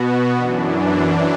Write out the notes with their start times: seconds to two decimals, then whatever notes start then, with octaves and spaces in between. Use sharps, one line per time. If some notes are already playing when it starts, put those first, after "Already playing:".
Already playing: B2 B3 F#4
0.36 F#2 E3 D4